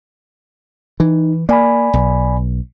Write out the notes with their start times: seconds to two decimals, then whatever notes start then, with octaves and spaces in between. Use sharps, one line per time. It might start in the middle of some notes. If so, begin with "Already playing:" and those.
1.00 E3 D#4
1.49 A#3 D5 G#5 B5
1.93 B1